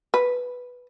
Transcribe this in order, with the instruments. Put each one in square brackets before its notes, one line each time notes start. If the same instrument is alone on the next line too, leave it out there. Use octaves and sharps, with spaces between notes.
[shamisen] B4